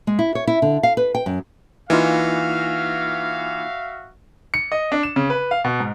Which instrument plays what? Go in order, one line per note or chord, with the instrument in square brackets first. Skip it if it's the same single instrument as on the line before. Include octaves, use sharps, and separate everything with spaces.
[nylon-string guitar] G#3
E4
C#5
E4
D3
F5
B4
G5
F#2
[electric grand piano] E3 [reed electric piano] A#3 D#4 F4 [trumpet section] F#4 E5 F5
[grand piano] C#7
D#5
D4
E7
C#3
B4
F5
B2
G#2